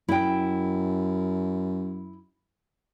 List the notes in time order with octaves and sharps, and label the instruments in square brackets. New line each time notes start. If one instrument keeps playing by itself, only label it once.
[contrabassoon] F#2 [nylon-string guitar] E4 G5